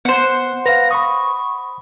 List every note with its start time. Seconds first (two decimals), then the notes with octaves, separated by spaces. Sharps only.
0.05 B3 C5 F#5
0.66 B4 F5 A#6
0.91 B5 C#6 D#6